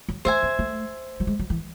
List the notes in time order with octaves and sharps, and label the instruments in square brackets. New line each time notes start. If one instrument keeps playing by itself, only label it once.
[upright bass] F#3
[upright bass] A3 [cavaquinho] C5 E5 G#5
[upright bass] C4
A3
F#3
G#3
F#3
E3